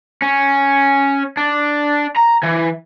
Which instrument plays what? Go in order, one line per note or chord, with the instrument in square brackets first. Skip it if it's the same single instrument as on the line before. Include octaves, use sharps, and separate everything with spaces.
[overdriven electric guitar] C#4
D4
A#5
E3